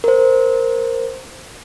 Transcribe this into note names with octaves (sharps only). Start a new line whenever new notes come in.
A#4 C5